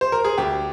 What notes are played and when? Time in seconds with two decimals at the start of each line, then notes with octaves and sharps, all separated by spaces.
0.01 C5
0.12 A#4
0.25 G#4
0.38 D2 G4